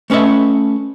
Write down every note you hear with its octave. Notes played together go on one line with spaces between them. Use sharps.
A3 C#4 B4 D#5 E5